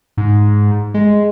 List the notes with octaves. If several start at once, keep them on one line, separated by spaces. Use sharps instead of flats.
G#2
G#3